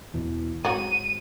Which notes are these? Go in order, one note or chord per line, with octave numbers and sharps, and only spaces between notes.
E2 B2 E3
G#2 F#3 C4 F#4 D#7